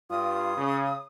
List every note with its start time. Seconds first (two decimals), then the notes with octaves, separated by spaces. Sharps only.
0.10 G2 F4 D#6
0.57 C#3